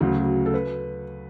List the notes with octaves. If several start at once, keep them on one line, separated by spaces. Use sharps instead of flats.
D2 C#3 F#3
A4
B4